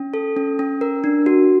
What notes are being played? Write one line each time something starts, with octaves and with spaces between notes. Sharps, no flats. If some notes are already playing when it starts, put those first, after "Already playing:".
Already playing: C#4
A4
C#4
C#4
A#4
D4
F#4